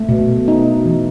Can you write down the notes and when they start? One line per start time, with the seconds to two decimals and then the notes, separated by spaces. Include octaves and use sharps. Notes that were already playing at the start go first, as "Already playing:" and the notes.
Already playing: A3
0.09 B2
0.48 D#4
0.86 E3